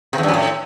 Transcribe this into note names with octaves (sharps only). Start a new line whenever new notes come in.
C3
E2
G2
F2
A2